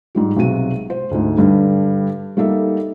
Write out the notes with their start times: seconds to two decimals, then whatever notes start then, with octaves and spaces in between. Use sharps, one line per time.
0.15 G#2 G3 G4
0.36 B1 C3 G#3 F#4 D#7
0.90 C5
1.11 D2 G#2
1.37 G2 D3 G3
2.37 G3 A#3 D#4 A4 E5